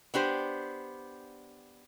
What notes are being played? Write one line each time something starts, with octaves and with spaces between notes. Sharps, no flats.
B3 D4 G4 C5